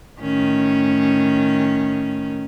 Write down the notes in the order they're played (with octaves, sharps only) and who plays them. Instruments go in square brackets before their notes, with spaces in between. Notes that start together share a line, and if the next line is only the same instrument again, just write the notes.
[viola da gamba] A2 D#3 C#4